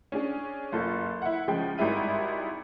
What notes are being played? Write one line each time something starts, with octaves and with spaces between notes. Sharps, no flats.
C#4 D4 G#4
F#1 F4 A4
E4 F#5
C#3 F3 G#3 G5
G#1 G3 G#3 E4 D#7